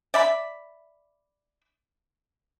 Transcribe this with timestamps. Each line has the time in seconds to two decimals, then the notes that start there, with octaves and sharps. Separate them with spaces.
0.14 D5 E5 B5